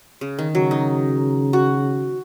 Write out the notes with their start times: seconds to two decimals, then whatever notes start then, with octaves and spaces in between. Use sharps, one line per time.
0.21 C#3
0.39 D#3
0.54 C#3 F#3
0.71 D#4
1.53 F#4